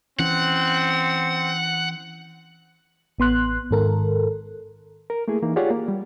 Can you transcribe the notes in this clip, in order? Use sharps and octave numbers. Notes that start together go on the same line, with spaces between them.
E3 C4 C#4 F#5
A1 B3 C6 F#6
G#2 D#3 A4 A#4
A#4
A3 A#3 E4 G#4
E3 A#3 D#4
F4 G4 G#4 C#5 D5 F#5
A#3
G3